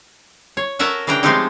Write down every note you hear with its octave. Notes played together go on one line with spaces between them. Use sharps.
C#5
F#4 A4 A#4 E5 F#5 G#5
C#3 E3 D4 G5 A#5
F3 G#3 A3 C4 D#4 G4